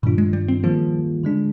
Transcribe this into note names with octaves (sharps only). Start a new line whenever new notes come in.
G2 A#2 D#3 G3 D4 F4
G#3
G3
C4
D#3 F3 G3 A#3 F4 G#4
D3 G#3 D4 G#4